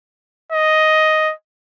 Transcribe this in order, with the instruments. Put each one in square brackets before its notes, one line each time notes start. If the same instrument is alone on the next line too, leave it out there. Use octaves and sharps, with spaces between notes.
[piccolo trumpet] D#5